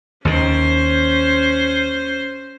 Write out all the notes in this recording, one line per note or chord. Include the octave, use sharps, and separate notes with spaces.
D#2 D#3 C#4 C5